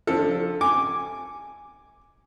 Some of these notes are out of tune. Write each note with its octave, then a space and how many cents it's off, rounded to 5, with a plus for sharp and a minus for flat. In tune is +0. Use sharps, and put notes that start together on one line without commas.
F3 +15 D4 +0 A4 +5
G#5 +0 D6 +0